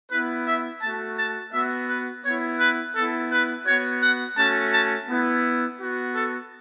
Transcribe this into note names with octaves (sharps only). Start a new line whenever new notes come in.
B3 E4 B4
E5
A3 F#4 A5
A5
B3 F#4 E5
B4
B3 E4 C#5
B4
B3 E4 A4
B4
B3 F#4 C#5
F#5
A3 C#4 F#4 A5
A5
B3 E4
B3 F#4
A4